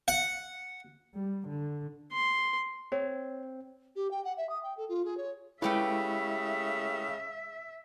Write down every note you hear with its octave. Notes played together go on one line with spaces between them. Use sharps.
F#5
G3
D3
C6
C4 C#5
G4
G5
F#5
E5
D#6
G5
A4
F4
G#4
C#5
C#3 G#3 A3 E4 G4 B4 E5